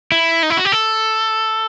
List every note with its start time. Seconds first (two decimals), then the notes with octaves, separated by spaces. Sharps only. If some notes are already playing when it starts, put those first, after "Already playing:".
0.12 E4
0.43 D#4
0.50 E4
0.57 F#4
0.65 G4
0.72 A4